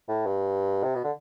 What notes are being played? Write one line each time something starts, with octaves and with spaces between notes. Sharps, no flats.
A2
G2
C3
B2
D3